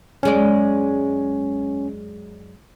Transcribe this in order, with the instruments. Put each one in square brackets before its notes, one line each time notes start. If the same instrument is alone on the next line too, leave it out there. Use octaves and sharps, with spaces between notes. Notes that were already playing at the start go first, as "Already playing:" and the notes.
[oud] F#2 G#3 D5 [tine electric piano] C#4